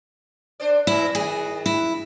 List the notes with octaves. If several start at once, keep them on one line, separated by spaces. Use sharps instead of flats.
D4 C5 D5
A#2 E3 E4
D#3 F#4 G#4
E4